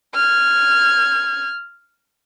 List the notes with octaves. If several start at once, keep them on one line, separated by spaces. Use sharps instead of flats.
F6 G#6